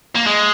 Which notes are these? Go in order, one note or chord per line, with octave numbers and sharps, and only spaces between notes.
A#3
G#3